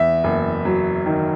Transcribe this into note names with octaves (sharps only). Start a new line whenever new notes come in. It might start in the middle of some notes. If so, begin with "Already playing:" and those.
Already playing: E2 E5
F#1
F#3
D#3